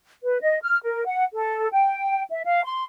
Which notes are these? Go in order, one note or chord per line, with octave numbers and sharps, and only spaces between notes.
B4
D#5
F6
A#4
F#5
A4
G5
E5
F5
C6